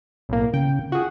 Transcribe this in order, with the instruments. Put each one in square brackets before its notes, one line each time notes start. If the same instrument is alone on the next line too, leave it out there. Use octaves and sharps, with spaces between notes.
[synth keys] B1 A2 A#3
[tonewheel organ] C#3 [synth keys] G5
[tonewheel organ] F4 [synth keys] F#4 G#4